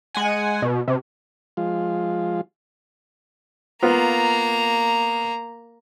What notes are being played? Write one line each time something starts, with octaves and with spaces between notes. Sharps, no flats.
G#3 F#5 G#5
B2
C3
F3 G#3 F4
A#3 B3 F4 A#5